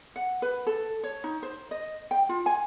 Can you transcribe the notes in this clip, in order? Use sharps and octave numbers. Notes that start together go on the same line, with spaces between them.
F#5
B4
A4
C#5
D#4
C5
D#5
G5
F4
G#5